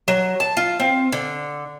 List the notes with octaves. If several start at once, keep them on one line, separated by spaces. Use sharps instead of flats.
F#3
A5
F4
C4
D3